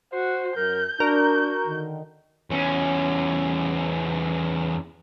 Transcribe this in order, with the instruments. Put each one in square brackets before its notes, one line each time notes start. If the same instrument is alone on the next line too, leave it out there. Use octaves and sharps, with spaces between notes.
[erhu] F#4 [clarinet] C5
[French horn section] F#2 [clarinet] A#4 [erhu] G6
[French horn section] D4 [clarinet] F#4 [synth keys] A#4
[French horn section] D3 D#3
[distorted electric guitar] E2 C#4